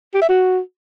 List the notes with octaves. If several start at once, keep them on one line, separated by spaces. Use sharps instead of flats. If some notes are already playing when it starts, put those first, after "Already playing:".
G4
E5
F#4